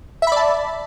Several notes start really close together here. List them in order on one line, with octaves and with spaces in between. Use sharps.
E5 B5 D5 A5